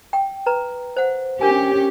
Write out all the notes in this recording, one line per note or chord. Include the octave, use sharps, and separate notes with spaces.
G5
B4 A#5
C5 F#5
C#4 D4 G4 A#4 G#5